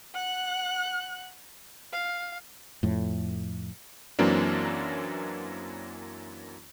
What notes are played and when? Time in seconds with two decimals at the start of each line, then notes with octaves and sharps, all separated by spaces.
0.14 F#5 F#6
1.92 F5
2.83 F2 A2
4.19 F#2 E3 F#3 A#3 C4 D4